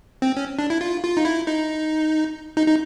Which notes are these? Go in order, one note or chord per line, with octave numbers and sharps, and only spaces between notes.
C4
C#4
D4
E4
F4
F4
D#4
E4
D#4
D#4
D#4